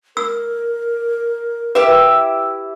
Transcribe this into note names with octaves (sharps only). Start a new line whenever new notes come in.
A#4 E6
E4 G4 B4 E5